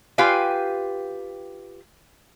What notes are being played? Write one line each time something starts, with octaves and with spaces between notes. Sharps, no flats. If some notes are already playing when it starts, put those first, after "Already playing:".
F4 G4 B4 F5 G5 G#5